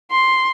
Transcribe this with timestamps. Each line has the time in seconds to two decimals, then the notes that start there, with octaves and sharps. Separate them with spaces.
0.11 C6